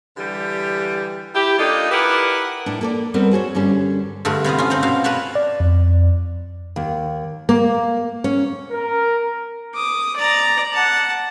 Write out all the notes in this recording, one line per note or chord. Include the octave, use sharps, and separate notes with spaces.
D3 E3 G3 G4
E4 G4
A#3 D4 D#4 F4 A4
E4 G4 A#4 B4 F#5
A2 D4
A#3 A4 D5
G3 B3 C4 A4 A#4
F#4 G#4 C5 C#5
G2 D3 G3 C#4
G2 D3 A3 A#4
C3 B3 F4 D#5
C#4 F4
C4 D#4 A#5
B2 F#4 F5
A#4 B4 C#5 F#5 A5
D5
F2
D#2
A#3
C#4
A#4
D6 D#6
D5 A#5
F#5 A5